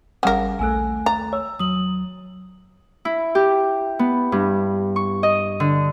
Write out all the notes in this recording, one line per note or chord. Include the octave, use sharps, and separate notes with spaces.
G#1 C#3 G3 A#4 F#5
A#1 D#2 A3 A4 G#5 E6 F#6
A#5 A6
C#5 E6
D#2 F#3 D#6 F#7
E4
G4
B3
G2
C#6
D#5
D3